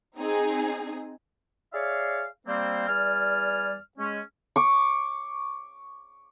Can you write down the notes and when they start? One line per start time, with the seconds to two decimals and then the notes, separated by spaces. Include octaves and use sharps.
0.16 C4 D#4 G#4
1.73 G#4 C#5 D5 E5 F5
2.47 G3 A#3 C4
2.88 E2 G3 D5 G#5 F6
3.98 G#3 C#4
4.56 C#6 D6